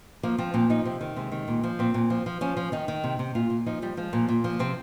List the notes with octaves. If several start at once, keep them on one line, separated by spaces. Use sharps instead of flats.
F3 A#3
F3 C4
A#2 C4
F3 D#4
C3 C4
D#3
C3 G#3
D#3
A#2
F3
A#2 C4
A#2
F3
F3
F3 C#4
F3
D#3 D#4
D#3
C3
C3
A#2 F4
A#2
F3 D#4
F3 G3
F3 G#3
A#2 A#3
A#2
F3
C3 C4